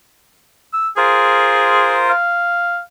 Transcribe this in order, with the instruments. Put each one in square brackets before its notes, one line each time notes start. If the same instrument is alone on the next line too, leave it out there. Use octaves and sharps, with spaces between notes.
[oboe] E6
[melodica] F4 A#4 C5 [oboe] G#4
[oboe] F5